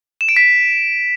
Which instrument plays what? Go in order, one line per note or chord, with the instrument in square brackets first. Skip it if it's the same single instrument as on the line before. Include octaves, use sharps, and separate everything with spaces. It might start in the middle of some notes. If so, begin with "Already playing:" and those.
[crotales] E7
D7
B6